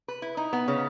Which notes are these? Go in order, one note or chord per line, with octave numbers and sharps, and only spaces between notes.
B4
E4
D#4
B3
C#3